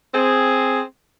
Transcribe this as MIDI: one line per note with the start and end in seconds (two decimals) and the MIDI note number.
0.14 0.82 60
0.14 0.82 68